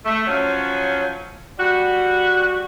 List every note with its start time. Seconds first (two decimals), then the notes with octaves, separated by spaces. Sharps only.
0.05 A3
0.27 F3 F#3 C#4
1.59 G3 F#4